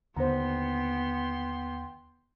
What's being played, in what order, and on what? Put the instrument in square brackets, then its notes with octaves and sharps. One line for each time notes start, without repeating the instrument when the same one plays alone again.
[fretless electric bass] D#2 D3 [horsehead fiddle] B3 [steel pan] C5 A#5 [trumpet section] G5 C6